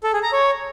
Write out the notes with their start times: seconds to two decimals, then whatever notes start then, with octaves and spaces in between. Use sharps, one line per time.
0.04 A4
0.13 G#4
0.23 A#5
0.32 C#5